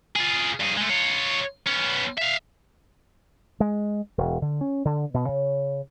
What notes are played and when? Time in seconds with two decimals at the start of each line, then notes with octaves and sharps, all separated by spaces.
0.16 F4 G#4
0.60 G2 G#4
0.77 G#3 A3
0.90 F4 C#5
1.67 B3 C#4
2.18 E5 F5
3.60 G#3
4.18 E1
4.42 D3
4.61 C#4
4.85 D3
5.14 B2
5.29 C#3